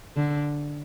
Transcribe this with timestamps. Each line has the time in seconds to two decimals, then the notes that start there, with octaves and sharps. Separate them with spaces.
0.16 D3